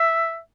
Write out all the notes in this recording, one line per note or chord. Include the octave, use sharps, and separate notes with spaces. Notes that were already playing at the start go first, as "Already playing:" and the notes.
Already playing: E5